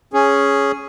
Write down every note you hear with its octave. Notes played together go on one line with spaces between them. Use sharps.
C#4 G#4